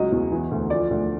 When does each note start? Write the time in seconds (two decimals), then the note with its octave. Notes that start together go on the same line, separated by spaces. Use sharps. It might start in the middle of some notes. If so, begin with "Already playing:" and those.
Already playing: C#2 F#3 D#5
0.12 E2
0.32 E3
0.51 D2
0.70 F3 D5
0.90 D2